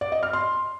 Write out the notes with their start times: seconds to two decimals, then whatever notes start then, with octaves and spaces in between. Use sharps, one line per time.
0.01 D5
0.12 D#5
0.23 F6
0.33 C6